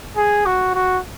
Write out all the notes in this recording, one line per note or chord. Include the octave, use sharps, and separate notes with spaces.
G#4
F#4
F#4